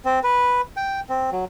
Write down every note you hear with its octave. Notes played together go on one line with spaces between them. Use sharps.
C4
B4
G5
C4
F#3